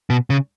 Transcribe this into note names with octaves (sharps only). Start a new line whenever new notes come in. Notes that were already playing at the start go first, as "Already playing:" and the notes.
B2
C#3